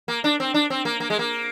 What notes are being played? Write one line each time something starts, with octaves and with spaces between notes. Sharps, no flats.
A#3
D4
C4
D4
C4
A#3
A#3
G#3
A#3